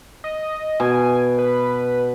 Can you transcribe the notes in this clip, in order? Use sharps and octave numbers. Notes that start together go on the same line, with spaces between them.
D#5
B2 G#5
B4